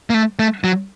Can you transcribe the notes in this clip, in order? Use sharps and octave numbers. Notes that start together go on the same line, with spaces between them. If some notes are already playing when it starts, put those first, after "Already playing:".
A#3
A3
A3
F#3